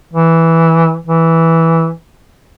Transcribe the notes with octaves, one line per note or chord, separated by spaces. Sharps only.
E3
E3